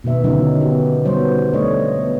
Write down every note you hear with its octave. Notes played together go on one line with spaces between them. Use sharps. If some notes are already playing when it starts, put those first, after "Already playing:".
B2 D#3 B3 E5
D3 D#3 F#3 C#4 D#4 A#4
B3 D#4 F#4 G4
F#3 G3 B3 C5 C#5
A3 D4 C#5 D#5
B3